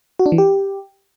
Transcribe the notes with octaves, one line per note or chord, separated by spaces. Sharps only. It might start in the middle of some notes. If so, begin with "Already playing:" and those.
F#4
D4
E3
G4